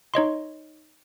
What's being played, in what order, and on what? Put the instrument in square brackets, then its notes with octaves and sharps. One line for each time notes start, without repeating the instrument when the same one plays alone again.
[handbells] D#4 C#5 D#5 C6